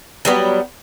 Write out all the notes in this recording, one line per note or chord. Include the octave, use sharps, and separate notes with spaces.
F#3 G3 B3